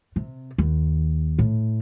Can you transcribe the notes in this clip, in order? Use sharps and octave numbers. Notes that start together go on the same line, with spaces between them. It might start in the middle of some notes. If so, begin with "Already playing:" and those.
C3
D#2
A2